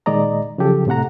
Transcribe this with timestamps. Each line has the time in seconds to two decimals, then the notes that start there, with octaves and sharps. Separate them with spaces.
0.06 A#2 D#3 G#3 D5 D#5 A#5
0.58 C#3 F3 F#3 G4 A4
0.87 A2 C3 A3 F#5 A#5